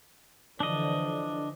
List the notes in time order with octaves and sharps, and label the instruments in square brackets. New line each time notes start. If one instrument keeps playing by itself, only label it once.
[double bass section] D3 E3 F3 [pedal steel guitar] D4 D#5